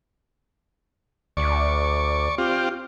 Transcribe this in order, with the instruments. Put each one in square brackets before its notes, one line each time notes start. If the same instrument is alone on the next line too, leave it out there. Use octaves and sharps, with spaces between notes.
[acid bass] D2 [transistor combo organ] D5 C#6
[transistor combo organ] C4 F4 G4